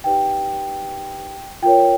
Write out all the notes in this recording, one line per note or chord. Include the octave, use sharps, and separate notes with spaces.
D#4 G4 B4 D5 G5
F4 A#4 C#5 G5